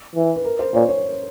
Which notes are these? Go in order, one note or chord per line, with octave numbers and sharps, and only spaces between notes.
E3
B4
A#4
C5
A#2 C#5
C#5